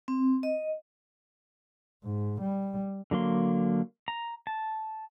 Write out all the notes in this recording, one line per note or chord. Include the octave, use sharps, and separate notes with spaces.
C4
D#5
G#2
G3
D3 F#3 A#3 C6
A#5
A5